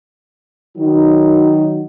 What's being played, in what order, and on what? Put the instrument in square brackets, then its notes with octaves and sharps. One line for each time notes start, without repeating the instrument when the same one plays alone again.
[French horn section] D#3 F#3 D#4